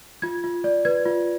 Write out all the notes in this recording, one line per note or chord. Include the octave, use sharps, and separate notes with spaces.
F4 G#6
F4
D5
B4 G#6
F4